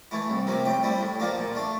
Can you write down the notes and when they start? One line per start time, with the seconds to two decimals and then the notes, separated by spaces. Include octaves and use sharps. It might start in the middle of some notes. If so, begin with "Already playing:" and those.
0.11 E3 A3 E4
0.30 C2
0.47 C3 F3 A#3
0.65 A2 G5
0.83 G3 C4 E4
1.01 A2
1.20 F3 A#3 D4
1.38 A#2
1.55 A3 D4